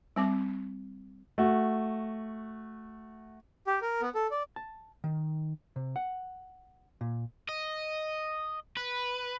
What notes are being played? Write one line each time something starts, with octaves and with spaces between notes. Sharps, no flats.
G3 C4 D6
A3 F#4
G4
A#4
B3
A4
D5
A5
D#3
C3
F#5
A#2
D#5
B4